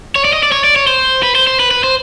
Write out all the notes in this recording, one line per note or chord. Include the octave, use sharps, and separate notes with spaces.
C#5
D5
D#5
D5
C#5
D5
C#5
C5
B4
C5
C5
B4
B4
C5